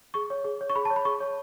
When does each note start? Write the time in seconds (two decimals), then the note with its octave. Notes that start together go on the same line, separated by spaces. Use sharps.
0.14 G#4 C#6
0.30 C#5
0.44 G#4
0.61 C#5
0.69 C#6
0.75 G#4 B5
0.85 A5
0.90 C#5
0.96 B5
1.05 G#4 C#6
1.20 C#5